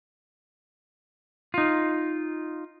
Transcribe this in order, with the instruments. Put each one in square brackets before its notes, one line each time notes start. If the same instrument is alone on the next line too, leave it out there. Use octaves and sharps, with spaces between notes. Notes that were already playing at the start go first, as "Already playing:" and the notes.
[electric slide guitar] D#4 F4